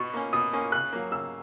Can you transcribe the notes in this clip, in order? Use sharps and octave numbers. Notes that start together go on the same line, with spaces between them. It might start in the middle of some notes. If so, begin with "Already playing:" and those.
Already playing: B2 C#6
A#3 C#4
B2 D#6
A#3 C#4
C#3 F#6
F#3 A#3
C#3 E6